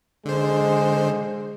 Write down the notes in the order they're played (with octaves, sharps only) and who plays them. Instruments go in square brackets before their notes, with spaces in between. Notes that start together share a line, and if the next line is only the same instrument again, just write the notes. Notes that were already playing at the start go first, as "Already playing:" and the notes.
[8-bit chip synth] D3 C5 [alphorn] G#3